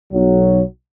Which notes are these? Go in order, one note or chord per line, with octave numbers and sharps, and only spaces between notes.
B1 F#3